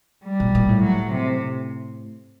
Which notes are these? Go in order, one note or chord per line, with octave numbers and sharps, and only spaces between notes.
G3
A#2
A#2
A2
F#3
C3